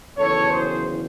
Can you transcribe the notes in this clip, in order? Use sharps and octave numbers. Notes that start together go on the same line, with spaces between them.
F#1 E2 D#3 A4 C#5
G#4 C5